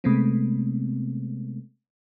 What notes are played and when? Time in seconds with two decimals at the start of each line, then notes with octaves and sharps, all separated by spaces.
0.04 C3 G#3 A3 B3 C4